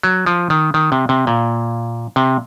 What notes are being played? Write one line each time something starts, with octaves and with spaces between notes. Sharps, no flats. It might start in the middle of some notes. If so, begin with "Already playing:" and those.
F#3
F3
D#3
D#3
C3
C3
A#2
C3